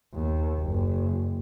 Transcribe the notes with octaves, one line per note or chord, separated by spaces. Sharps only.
D#2
F#1